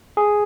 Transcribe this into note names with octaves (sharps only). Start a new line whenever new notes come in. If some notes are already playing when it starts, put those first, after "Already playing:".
G#4